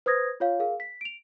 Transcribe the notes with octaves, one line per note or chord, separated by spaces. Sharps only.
B4 C5 D#6 G#6 A#6
F4 C#5 F5
G#4 A#4 F5
B6
D7 F7